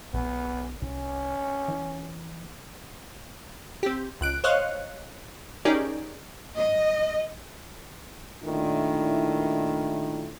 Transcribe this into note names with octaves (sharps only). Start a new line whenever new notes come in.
B1 B3
C2 C#4
E3
C4 G4
C#2 F#6 D7
C5 C#5 D#5 F5 F#6
C#4 D#4 G4 G#4 A#4 D5
D#5
A#2 D#3 A3 D4 E4